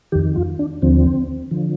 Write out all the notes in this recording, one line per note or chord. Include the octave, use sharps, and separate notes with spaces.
F2 D#3 G4
F4
D4
D#2 D3 F3 C4
D3 F3